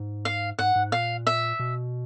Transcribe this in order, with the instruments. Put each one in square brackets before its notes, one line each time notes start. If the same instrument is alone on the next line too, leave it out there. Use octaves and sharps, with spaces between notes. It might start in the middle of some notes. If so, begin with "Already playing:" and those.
Already playing: [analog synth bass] G#2
[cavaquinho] F5
[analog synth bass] G#2 [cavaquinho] F#5
[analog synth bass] G#2
[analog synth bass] A#2 [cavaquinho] F5
[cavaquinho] E5
[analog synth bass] B2